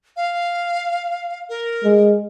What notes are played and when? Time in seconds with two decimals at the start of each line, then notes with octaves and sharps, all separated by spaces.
0.16 F5
1.49 A#4
1.84 G#3